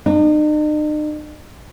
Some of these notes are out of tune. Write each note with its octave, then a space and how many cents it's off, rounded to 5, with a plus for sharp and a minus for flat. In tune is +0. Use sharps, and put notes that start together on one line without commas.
D#4 -45